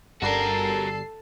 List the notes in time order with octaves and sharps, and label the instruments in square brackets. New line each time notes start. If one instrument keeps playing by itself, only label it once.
[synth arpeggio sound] G1 G3 C7 [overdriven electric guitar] F#4 A#4 [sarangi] A4